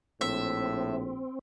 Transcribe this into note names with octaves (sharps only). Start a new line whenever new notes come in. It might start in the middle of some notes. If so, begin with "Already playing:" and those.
A#1 A2 C4 E5